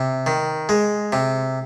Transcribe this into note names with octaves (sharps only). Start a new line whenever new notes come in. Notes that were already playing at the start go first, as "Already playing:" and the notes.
Already playing: C3
D#3
G#3
C3